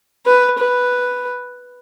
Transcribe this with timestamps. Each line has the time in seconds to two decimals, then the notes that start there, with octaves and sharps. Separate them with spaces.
0.26 B4
0.59 B4